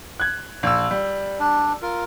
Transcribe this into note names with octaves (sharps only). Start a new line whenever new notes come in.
F#6 G#6
A#1 E6
G3
D4
F4 A#4